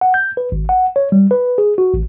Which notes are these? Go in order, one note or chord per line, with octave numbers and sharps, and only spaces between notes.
F#5
G6
B4
G#1
F#5
C#5
G3
B4
G#4
F#4
A1